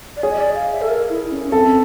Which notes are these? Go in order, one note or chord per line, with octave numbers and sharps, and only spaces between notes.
D5
G#4 C#5
D#5
D5
F5
E5
A4
A#4
E4
C#4
C#4
C4 A4